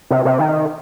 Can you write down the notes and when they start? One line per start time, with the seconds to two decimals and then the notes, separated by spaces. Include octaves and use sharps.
0.11 C3
0.25 C3
0.39 D#3